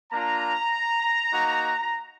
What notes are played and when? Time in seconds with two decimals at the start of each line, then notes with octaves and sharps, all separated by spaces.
0.12 A#3 D4 F4 A#5
1.32 A#3 D#4 F#4